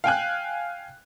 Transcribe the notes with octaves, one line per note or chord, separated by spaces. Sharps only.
F5 G5 G#5 F#6